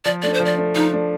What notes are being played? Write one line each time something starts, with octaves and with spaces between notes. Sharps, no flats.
F3 D5
A3 D4 D5
C5
F3
D5
A3 D4
F3 D#4
A3 D4